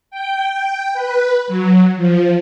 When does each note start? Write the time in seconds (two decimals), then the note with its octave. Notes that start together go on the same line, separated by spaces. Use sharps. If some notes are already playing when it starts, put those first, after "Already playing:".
0.10 G5
0.93 B4
1.47 F#3
1.97 F3